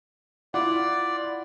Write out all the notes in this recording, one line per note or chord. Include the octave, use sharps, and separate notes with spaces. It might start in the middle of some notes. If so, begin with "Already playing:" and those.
E4 F4 D5 F#5